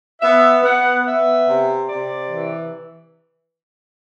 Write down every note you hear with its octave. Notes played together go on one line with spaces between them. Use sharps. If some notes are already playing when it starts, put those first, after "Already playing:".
B3 E5
B3 F#5
B3 E5
C3
C3 D5
E3